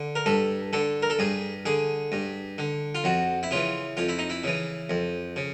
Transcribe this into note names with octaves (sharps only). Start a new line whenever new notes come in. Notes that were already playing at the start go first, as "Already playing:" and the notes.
Already playing: D3
A#4
G2 A4
D3 A4
A#4
A4
G2 G#4
D3 G#4
G2
D3
F4
F2 F#4
E4
C#3 E3 F4
F2 F4
E4
D#4
E4
C#3 E3
F2
C#3